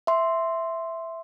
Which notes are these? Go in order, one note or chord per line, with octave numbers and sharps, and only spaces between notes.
E5 C6